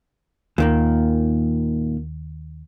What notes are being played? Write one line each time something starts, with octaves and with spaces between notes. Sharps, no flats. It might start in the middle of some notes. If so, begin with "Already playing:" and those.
D#2 A#2 D#3 A#3